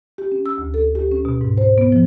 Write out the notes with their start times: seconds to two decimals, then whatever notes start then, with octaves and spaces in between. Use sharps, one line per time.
0.18 G4
0.32 C#4
0.46 E6
0.58 D2
0.74 A4
0.95 G4
1.11 C#4
1.25 B2
1.41 G#2
1.58 C5
1.78 B3
1.92 F3